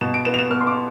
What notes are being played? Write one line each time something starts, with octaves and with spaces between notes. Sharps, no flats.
B2 E7
D7
B3 E7
F7
E7
B3 F6
C6
D6